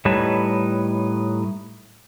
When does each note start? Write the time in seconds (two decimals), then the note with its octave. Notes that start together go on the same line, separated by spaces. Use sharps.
0.05 A2 G3 D#4 B4 C#5 A5